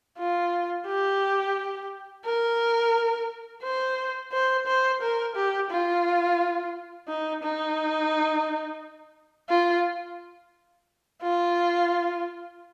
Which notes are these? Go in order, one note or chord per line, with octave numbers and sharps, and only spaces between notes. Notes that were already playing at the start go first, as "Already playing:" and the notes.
F4
G4
A#4
C5
C5
C5
A#4
G4
F4
D#4
D#4
F4
F4